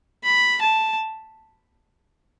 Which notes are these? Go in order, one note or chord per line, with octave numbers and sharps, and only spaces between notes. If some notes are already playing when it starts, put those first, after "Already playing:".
B5
A5